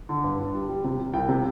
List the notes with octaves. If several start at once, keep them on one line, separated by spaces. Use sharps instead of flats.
D3
G2
D4
G3
G3
C3
G3
C2 G5
C3